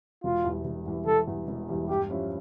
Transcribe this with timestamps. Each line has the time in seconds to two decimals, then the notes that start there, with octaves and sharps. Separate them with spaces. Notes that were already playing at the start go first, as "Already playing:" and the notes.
0.24 E1 F4
0.44 E2 E3 G3
0.65 E1
0.86 E2 E3 G3
1.07 E1 A4
1.28 E2 E3 G3
1.48 E1
1.69 E2 E3 G3
1.89 G2 G4
2.10 F3 C#4 E4 G4